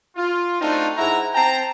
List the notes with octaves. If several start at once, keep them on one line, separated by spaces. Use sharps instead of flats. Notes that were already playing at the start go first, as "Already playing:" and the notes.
F4
A3 C4 D4 D#4 F4 F#4
G#2 E4 F#5 A#5
C4 G5 A5 A#5